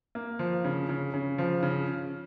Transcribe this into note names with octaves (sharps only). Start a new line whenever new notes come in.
A#3
F3
C#3
C#3
C#3
F3
C#3